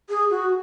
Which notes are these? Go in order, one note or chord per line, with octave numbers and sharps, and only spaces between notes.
G#4
F#4